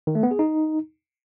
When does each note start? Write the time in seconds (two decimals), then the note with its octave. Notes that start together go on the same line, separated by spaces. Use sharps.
0.07 D#3
0.15 A3
0.23 B3
0.31 G#4
0.39 D#4